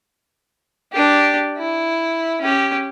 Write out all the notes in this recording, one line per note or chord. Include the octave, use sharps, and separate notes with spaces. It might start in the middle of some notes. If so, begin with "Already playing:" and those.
D4 G4
E4
C#4 G4